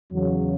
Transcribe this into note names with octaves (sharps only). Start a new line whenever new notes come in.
E2 C#3 F#3